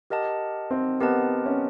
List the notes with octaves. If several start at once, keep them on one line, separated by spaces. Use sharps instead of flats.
G4 A#4 D#5 F#5 A5
C4
B3 G4 A#4 D#5 F#5 A5
C#4